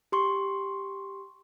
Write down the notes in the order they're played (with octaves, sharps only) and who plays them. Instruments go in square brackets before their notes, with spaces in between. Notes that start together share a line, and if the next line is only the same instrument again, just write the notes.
[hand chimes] G4 C6 C#6